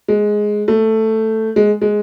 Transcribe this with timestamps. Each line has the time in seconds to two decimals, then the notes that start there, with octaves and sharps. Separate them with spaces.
0.08 G#3
0.68 A3
1.56 G#3
1.82 G#3